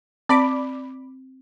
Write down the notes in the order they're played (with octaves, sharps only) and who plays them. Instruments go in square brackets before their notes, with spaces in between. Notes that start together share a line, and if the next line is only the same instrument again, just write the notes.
[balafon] C4 [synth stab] D5 B5 D6